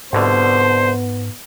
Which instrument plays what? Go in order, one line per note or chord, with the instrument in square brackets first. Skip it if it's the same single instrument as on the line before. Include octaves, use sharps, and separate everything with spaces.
[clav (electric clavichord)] C2 B2 D3 [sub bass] G#2 [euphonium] B3 [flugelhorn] C5